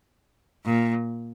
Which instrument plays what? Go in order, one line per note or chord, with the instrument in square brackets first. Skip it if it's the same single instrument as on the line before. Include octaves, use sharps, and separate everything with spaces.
[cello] A#2